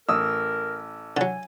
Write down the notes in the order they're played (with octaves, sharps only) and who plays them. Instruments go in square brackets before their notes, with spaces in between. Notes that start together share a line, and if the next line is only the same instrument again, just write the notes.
[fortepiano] A1 D#6 [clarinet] A#4 [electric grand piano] E6
[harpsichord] D3 F#3 [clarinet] G#5